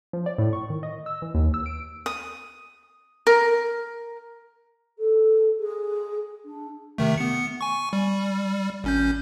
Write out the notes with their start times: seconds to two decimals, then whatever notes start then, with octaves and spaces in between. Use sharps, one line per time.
0.13 F3
0.26 D5
0.38 A2
0.53 C#6
0.70 D#3
0.83 D#5
1.06 E6
1.22 E3
1.35 D#2
1.54 E6
1.66 D7
2.06 D#6
3.27 A#4
4.98 A4
5.60 G#4
6.45 D4
6.98 C3 D#3 A3
7.18 B3 C#7
7.61 G#5 C#6
7.93 G3
8.84 G#1 C#4 G6